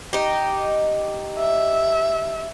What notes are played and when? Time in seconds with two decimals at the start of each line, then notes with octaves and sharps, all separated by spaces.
0.13 D#4 G4
1.38 E5